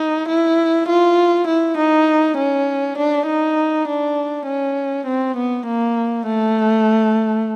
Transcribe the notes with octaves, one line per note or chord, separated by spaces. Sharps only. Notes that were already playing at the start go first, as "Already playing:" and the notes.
Already playing: D#4
E4
F4
E4
D#4
C#4
D4
D#4
D4
C#4
C4
B3
A#3
A3